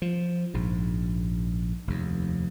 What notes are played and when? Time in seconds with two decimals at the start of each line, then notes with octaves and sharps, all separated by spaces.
0.02 F3
0.54 A#1 G#2
1.87 F1 D#2